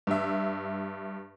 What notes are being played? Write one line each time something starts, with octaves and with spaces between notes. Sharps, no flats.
G2 E5